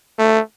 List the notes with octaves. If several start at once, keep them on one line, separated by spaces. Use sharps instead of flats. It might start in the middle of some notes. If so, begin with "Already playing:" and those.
A3